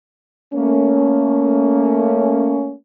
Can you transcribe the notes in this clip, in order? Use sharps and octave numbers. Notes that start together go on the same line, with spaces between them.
A3 A#3 C#4